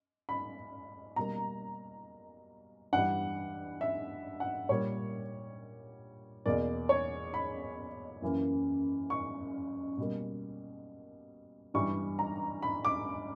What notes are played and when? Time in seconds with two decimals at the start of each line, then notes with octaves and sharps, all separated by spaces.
0.29 B5
1.16 B2 G3 A#3 A#5
2.93 G2 E3 G3 F#5
3.81 E5
4.40 F#5
4.69 A#2 G3 A#3 C#5
6.46 E2 B2 A#3 D5
6.89 C#5
7.34 B5
8.22 F#2 E3 A#3
9.10 C#6
9.98 B2 G3 A#3
11.74 G2 E3 G3 C#6
12.19 A#5
12.62 B5
12.85 D6